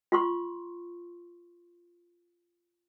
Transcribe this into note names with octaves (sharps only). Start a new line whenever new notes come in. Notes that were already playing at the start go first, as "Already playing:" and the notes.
F4 C6 C#6